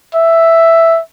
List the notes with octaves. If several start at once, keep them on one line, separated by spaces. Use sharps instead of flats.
E5